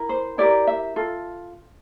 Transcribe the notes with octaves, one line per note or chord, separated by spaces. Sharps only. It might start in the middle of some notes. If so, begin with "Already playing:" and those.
Already playing: E4 A#4
C5
E4 G4 A#4 D5
E5
F4 A4